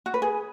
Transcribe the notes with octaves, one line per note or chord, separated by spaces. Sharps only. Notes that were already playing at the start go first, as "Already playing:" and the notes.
F#4
B4
G#4